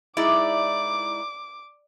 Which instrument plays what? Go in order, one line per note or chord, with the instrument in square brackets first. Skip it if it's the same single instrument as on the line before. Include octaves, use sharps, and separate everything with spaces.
[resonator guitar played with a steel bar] G#3 D#4 E4 [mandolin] D5 [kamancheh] D6